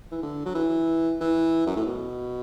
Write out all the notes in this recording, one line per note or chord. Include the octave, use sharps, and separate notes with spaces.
E3
D3
F#3
E3
E3
F#2
A2
B2